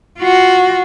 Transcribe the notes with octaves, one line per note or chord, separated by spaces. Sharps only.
F4 F#4